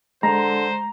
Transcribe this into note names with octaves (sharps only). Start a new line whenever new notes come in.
D3 G#3 C5 A#5